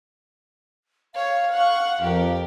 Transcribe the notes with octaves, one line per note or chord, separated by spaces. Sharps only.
C#5 F5
F#5 C#6
F2 G4 A#4